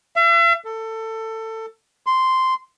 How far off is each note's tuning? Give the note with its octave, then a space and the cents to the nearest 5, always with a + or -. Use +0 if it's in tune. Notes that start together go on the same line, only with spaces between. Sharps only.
E5 +45
A4 +20
C6 -5